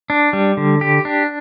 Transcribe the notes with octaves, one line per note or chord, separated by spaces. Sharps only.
D4
G3
D3
G4
D4